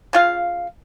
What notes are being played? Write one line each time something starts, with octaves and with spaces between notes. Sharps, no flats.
C#3 F4 F5